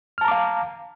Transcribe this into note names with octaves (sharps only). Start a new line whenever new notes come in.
F5 A5 A#5 D6 F6